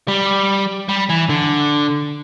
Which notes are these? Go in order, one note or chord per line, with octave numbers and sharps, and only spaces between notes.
G3
G3
E3
D3